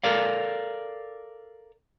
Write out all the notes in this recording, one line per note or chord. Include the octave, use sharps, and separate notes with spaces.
A4 A#4 D5 F5